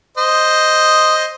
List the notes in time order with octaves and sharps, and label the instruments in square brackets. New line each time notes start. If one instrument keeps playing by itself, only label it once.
[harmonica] C5 D#5